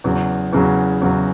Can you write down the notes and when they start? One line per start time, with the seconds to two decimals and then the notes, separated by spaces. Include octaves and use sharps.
0.04 E2 C#3 F#3
0.53 E2 C#3 F#3
1.01 E2 C#3 F#3